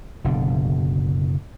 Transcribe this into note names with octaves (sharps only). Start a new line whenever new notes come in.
F#1 B2 D3